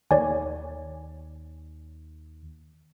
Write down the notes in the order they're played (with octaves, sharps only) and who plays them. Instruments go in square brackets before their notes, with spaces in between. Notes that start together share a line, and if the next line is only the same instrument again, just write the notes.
[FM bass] D#2 [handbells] C#5 D5 G#5